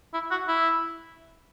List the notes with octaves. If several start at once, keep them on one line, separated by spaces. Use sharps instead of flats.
E4
F#4
E4